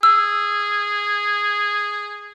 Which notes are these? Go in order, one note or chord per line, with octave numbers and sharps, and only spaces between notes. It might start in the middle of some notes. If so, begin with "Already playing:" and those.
G#4 E6